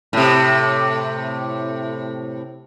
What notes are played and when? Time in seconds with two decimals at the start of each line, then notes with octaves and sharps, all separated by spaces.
0.13 A2 C3